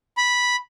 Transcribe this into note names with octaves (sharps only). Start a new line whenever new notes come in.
B5